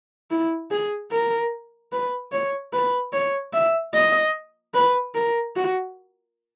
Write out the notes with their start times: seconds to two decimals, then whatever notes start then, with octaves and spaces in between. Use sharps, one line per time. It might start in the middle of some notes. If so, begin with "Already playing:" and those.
0.31 E4
0.71 G#4
1.11 A#4
1.92 B4
2.32 C#5
2.73 B4
3.13 C#5
3.54 E5
3.94 D#5
4.74 B4
5.15 A#4
5.56 F#4